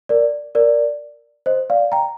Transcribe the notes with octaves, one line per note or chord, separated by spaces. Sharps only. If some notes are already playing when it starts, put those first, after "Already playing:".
A#4 D5
A#4 D5
C5 D#5
D5 F5
G5 A#5